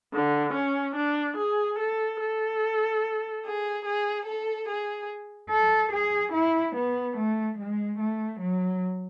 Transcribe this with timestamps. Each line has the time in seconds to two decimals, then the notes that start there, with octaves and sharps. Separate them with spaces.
0.13 D3
0.54 C#4
0.95 D4
1.37 G#4
1.79 A4
2.19 A4
3.44 G#4
3.85 G#4
4.26 A4
4.67 G#4
5.50 A4
5.92 G#4
6.32 E4
6.75 B3
7.16 A3
7.57 G#3
7.97 A3
8.40 F#3